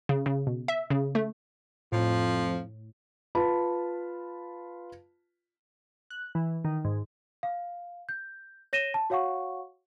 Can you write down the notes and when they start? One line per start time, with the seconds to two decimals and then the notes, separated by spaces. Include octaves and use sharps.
0.09 C#3
0.26 C#3
0.47 B2
0.68 E5
0.90 C#3
1.15 A3
1.92 F2 A2 F3
3.35 F4 B4 A5 B5
6.10 F#6
6.35 E3
6.65 D#3
6.85 G#2
7.43 F5
8.09 G6
8.73 C#5 A#6 D#7 E7 G7
8.94 A5
9.10 F#4 C#5 F5 F#5 C#6